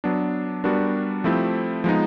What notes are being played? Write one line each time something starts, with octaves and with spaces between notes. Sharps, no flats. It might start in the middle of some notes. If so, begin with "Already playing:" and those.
F#3 B3 D4
G3 B3 D4 F#4 A#4
F3 A3 C4 E4 G4
F3 G#3 B3 D#4